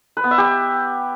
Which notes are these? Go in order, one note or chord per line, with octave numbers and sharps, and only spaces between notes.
B4
B3
E5
G4